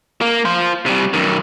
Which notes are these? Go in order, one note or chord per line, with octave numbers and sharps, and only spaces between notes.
A#3
F4 C5
C3 G3
F#2 D#3